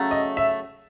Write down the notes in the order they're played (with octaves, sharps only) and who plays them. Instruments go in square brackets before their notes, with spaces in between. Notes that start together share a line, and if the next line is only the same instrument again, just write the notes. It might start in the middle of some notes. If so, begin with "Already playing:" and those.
Already playing: [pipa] C#3 F#3 A3
[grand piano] D#5
E5